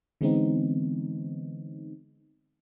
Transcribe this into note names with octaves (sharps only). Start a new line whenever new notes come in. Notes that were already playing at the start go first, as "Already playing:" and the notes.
D3 E3 G#3 B3 C4 D#4